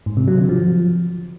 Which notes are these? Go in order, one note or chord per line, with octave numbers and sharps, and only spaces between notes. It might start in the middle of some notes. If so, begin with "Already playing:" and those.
G#2
C3
F#3
D3
F3